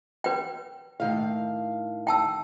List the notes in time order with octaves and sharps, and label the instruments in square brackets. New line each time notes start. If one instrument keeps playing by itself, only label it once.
[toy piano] B4 G5
[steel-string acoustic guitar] A2 D#3 F5
[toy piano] G5 A5 E6